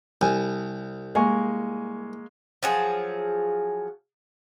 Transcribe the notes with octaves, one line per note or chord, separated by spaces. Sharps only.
C2 G#5 A5
G#3 A#3 G#5 C#6
F3 F#3 G#4